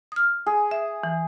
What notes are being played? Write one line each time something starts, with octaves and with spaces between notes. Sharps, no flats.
D#6 F6
G#4
E5
E3